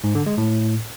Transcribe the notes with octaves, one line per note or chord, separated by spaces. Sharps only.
G#2
D3
G#3
A2